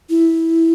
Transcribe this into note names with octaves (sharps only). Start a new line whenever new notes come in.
E4